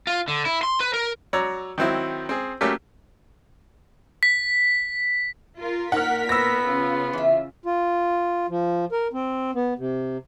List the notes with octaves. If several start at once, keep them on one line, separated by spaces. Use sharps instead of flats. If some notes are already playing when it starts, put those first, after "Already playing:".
F4
D3
E4
C6
B4
A#4
F#3 C#5 D5 A#5 E6
D#3 F#3 C4 E4
C4 G#4
F#3 A3 A#3 C#4 G4
B6
F4 A#4
A#2 D#4 A#4 F#5 F6 B6
B3 E6 A#6
C#3 F4
E3 E5
F4
F3
A#4
C4
B3
C3